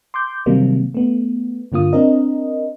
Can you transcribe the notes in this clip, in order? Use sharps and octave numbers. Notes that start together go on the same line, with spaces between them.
C6 D6 G6
C3 D#3 F#3 G3 A#3 C4
A3 B3
G2 D3 A#3 F4 D#6
C4 D4 A#4 D#5